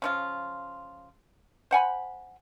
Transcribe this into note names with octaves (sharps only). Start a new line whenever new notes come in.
C#3 F3 F4
C5 F#5 G#5 B5